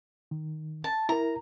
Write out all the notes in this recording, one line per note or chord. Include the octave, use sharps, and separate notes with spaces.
D#3
A5
E4 A#4 A#5